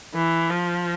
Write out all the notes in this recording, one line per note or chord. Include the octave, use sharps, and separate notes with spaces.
E3
F3